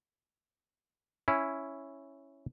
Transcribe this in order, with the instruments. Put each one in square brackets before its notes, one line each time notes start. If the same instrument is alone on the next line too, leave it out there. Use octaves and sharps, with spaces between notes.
[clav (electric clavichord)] C#4 E4